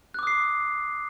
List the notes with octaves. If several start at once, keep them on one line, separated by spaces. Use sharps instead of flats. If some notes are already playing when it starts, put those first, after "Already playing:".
D6 D#6 F#6 C7